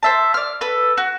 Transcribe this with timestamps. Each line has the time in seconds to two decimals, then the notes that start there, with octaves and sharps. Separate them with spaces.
0.03 C5 E5 A5
0.34 D5 F6
0.61 A4 B4
0.97 F#4